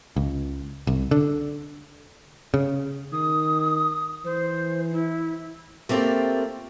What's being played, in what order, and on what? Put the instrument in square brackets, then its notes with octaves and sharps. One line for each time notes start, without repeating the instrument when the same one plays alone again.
[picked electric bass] C#2
C2
D3
C#3
[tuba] D#3 [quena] D#6
[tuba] E3 [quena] C5
[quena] E4
[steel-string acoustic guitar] A3 A#3 C4 D#4 F4 G4